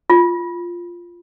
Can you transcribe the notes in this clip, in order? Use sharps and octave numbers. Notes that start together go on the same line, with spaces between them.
F4